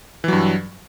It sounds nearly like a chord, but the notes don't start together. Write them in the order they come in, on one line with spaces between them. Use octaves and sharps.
E3 F#3 G2